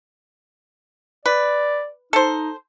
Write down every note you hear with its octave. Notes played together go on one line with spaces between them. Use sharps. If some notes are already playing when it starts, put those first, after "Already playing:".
B4 D5
D#4 A4 C5